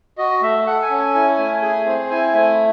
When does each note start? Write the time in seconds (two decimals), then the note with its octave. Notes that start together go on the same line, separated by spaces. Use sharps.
0.18 F#4 D#5
0.42 A3 E5
0.66 A4 F#5
0.82 G#5
0.90 C#4
0.98 G#5
1.14 E4 G#5
1.38 A3
1.62 G#4
1.86 C4
2.10 E4 G#5
2.34 A3